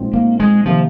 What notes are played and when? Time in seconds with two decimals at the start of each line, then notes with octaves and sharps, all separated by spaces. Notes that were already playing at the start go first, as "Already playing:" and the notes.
Already playing: A#1 A#2 G#3 C4 D#4
0.14 A#3
0.40 G#3
0.66 C3 D#3 F3 A#3